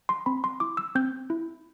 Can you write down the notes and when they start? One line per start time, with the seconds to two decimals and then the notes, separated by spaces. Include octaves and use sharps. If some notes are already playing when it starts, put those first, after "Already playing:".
0.09 C6
0.26 C4 B5
0.44 C6
0.60 E4 D6
0.77 E6
0.95 C4 G6
1.30 E4